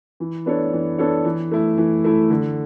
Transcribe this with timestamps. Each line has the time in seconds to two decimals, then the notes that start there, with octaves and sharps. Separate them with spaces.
0.20 E3
0.46 B3 D4 A4 C#5
0.73 E3
0.98 B3 D4 A4 C#5
1.25 E3
1.52 A3 E4
1.78 E3
2.04 A3 E4
2.30 D3